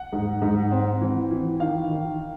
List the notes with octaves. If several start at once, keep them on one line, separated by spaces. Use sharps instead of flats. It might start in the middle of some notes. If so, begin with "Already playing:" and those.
Already playing: F#5
G#2
G#2
C4
E3
E3
D#3 F5
D#3